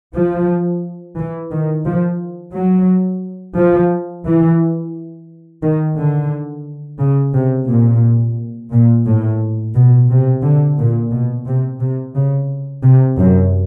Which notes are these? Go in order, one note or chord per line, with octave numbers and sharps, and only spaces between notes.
F3
E3
D#3
F3
F#3
F3
E3
D#3
D3
C#3
C3
A#2
A#2
A2
B2
C3
D3
A#2
B2
C3
C3
C#3
C3
F#2